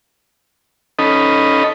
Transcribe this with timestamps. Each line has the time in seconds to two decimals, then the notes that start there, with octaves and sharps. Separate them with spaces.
0.99 C#4 D#4 A4 D#5 B5